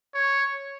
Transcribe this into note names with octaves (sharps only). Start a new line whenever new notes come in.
C#5